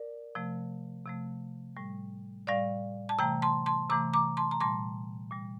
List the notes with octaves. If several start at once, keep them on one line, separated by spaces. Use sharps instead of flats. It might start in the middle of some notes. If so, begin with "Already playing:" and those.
Already playing: A#4 D5
C3 F3 A3
C3 F3 A3
A2 G3
A2 G3 D5 F5
A5
C3 E3 A3 G5 A#5
A5 C6
A5 C6
C3 E3 A3 A#5 D6
A#5 D6
A5 C6
A#5
A#2 G3 A5 C6
A#2 G3